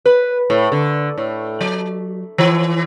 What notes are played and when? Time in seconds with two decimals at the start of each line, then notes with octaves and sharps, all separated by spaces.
0.05 B4
0.50 A2
0.72 D3
1.18 A2
1.61 F#3
2.38 E3